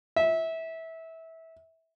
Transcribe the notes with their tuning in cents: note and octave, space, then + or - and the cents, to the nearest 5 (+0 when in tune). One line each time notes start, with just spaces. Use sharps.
E5 -20